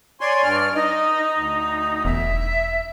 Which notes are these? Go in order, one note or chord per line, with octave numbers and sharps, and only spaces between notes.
C#5 D5 G#5 C6
G2 F6
D#4 D#5
D2
E1 E5